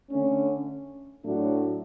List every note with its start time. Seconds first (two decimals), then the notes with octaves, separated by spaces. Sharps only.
0.11 D3 A3 C#4
1.24 A2 F#3 A3 D4 F#4